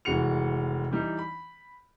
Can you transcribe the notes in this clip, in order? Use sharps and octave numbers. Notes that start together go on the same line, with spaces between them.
F1 E3 G#3 F#4 C#7 F7
E3 G3 D#4
B5